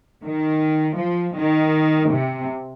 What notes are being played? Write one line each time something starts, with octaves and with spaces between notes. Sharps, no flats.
D#3
F3
D#3
C3